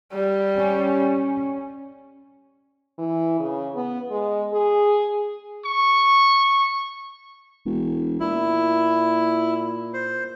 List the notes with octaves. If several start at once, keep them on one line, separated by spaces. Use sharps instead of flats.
G3
C#4
E3
C#3
B3
G#3
G#4
C#6
E1
A#2 E4
C5